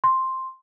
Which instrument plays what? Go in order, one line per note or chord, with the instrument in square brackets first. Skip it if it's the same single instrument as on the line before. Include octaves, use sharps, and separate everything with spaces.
[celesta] C6